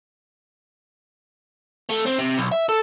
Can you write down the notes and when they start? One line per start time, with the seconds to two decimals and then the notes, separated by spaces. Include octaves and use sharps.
1.89 A3
2.06 C4
2.19 C3
2.38 B1
2.52 E5
2.69 A4